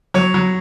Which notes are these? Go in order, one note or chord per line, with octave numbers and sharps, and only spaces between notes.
F#3 C#5
F#3